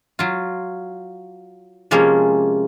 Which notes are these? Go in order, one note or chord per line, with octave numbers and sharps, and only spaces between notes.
F#3 F4
C3 F3 G#3 A#3 C#4